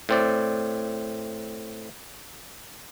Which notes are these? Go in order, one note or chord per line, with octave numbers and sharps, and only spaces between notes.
A2 C4 D5